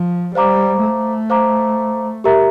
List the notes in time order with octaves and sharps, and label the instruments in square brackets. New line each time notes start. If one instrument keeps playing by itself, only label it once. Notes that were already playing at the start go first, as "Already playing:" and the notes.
Already playing: [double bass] F3
[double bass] G3 [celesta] C5 F5 A#5 D6
[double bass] A3
[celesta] C5 F5 A#5 D6
G4 A#4 E5 A#5